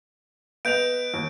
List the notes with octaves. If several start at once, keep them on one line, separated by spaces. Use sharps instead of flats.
B3 D#5 G6 D7 F7
D#2